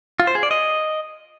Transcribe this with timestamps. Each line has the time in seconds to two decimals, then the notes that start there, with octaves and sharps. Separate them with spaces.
0.20 F4
0.27 C5
0.35 G#4
0.43 D5
0.51 D#5